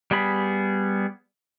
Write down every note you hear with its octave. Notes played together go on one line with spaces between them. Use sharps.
G3 B3 G#4 B5